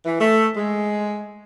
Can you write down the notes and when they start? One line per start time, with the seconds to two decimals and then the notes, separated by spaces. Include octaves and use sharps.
0.05 E3
0.21 A3
0.56 G#3